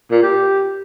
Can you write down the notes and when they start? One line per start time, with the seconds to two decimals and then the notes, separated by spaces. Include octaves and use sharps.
0.11 A#2
0.23 G4